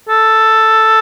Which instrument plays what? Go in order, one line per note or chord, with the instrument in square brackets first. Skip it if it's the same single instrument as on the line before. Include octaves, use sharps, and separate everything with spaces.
[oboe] A4